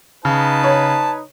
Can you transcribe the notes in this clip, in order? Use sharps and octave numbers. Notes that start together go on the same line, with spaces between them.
C#3 D#4 B4 A5
C#5